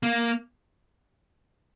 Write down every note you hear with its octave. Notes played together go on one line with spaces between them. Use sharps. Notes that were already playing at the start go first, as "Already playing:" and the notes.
A#3